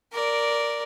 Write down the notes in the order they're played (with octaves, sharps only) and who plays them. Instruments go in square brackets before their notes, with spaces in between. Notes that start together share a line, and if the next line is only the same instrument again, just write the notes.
[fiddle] A#4 D5